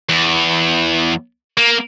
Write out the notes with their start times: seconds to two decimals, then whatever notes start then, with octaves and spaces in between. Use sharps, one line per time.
0.09 E2
1.57 A#3